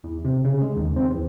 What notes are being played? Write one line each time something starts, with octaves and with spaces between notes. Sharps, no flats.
E2
C3
C#3
G#3
D#2
C4
E2